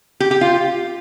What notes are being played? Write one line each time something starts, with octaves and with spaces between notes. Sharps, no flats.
G4
G4
F4